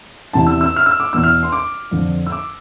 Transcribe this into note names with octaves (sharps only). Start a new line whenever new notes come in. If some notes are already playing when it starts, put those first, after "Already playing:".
E2 C3 E3 A5
E6
E6
F6
E6
D6
E2 B2 E6
F6
C6
D6
F2 D3 F3
E6
D6